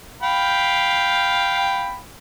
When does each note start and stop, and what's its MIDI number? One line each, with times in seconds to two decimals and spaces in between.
0.22 1.98 77
0.22 1.98 79
0.22 1.98 83